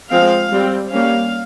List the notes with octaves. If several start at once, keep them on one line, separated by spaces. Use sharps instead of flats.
F3 G#3 C4 F5
G3 C4
G3 A#3 C#4 F5